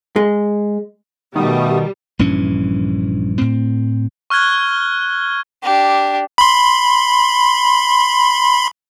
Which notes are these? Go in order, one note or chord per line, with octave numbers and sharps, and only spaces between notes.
G#3
B2 D#3 G3 A3 B3 D#6
A#1 G2 E3 C#4
A2 C4
C#6 F6 F#6 G#6 G7
D4 G4
B5 C6